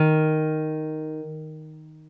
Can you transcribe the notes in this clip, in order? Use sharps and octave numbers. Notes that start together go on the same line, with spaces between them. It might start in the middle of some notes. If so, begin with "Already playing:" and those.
Already playing: D#3